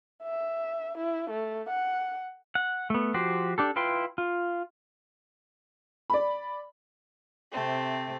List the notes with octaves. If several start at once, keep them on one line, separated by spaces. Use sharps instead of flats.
E5
E4
A3
F#5
F#5
A3 B3
F3 F#4 G4 C5
D4 G4 A4
E4 F4 B4 G5 C6
F4
D5 B5
C3 A3 C4